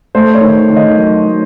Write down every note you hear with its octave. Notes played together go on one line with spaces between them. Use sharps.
A3 C5
C#5
D#3
D#3
D#5
F#3
A3